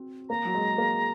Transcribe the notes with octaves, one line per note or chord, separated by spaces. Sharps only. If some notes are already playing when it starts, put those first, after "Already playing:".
Already playing: C4 F#4
A#3 A#5
F#3
G#3
A#3